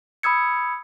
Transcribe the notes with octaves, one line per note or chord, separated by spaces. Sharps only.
B5 D#6 E6 G#6 C#7